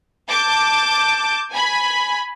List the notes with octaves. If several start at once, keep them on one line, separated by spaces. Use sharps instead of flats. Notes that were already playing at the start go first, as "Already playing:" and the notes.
A5 D6 G6
G#5 B5